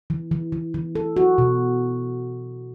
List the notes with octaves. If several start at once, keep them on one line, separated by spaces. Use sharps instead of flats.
E3
E3
E3
E3
A4
F#4
B2